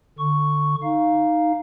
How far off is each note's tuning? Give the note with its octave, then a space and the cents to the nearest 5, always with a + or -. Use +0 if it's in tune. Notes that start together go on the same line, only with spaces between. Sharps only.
D3 +20 C#6 +0
D#4 +0 F5 +0